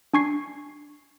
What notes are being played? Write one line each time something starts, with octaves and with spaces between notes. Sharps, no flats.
D4 G#5 C#6 G#6 C7